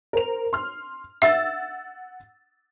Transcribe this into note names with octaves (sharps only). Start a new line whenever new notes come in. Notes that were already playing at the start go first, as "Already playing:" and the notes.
A#4 C5 F7
C6 F6
E5 F#5 E6 A6